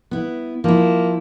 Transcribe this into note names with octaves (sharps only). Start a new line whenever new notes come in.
B3 E4
F3 A#3 E4